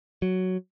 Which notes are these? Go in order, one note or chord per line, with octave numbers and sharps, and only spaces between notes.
F#3